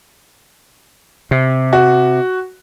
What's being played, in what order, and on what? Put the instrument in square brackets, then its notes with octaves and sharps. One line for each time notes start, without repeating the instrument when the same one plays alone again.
[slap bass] C3
[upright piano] F#4